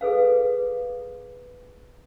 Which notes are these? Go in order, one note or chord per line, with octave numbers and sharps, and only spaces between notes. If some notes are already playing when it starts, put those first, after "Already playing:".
G#4 A4 B4 F5